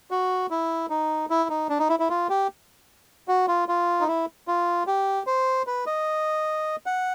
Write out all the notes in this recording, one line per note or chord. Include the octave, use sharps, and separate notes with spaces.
F#4
E4
D#4
E4
D#4
D4
D#4
E4
E4
F4
G4
F#4
F4
F4
D#4
E4
F4
G4
C5
B4
D#5
F#5